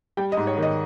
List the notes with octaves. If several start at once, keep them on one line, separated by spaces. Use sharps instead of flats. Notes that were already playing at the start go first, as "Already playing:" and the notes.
G3 G5
D#5
G#2
C#5
D#3
D#5